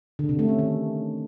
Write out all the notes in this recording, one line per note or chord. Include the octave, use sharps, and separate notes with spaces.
D3
C3
A3
C#4
D#3